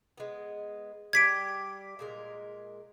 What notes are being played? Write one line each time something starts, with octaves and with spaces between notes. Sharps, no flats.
G#3 B3
G3 G4 G#6 B6 D7
A#2 G#3 A#4